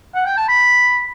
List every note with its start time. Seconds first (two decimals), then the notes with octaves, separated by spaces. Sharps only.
0.15 F#5
0.26 G5
0.37 A5
0.48 B5